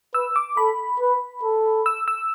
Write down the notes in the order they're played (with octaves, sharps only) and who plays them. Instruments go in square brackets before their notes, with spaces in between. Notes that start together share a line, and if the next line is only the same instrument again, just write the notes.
[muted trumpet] B4 [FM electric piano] E6
[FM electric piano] D6
[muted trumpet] A4 [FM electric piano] B5
[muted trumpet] B4
A4
[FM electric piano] E6
E6